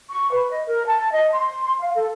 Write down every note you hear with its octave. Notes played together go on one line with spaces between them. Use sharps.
C#6
B4
D#5
A#4
A5
D#5
C6
F5
A4